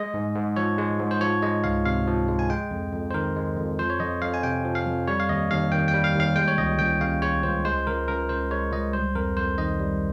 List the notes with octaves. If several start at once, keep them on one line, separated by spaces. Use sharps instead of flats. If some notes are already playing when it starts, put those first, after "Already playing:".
Already playing: G#3 D#5
G#2
G#2
F3 C#5
G#3
G#2
C5
F3 C#5
G#3 D#5
C#2 F5
C3 F5
F3
G#3
G#5
G#3 G5
F2
F2
C5
D#3 A#4
G#3
F2
F3 C5
C#5
F2 D#5
F2 F5
G#5
C3 G5
F3
F5
F2
G3 C#5
F5
D#2 D#5
D#2 F5
D#3 G5
G5
G3
F5
D#2
F5
G#3 G5
C#5
C#2 D#5
C#2 G5
C#3 F5
G#3 C#5
C#2 C5
G#3 C5
C#2 A#4
C#2 A#4
C#3 C5
G#3 C#5
C#2 D#5
G3 C5
F2 A#4
F2 C5
D#3 D#5
G3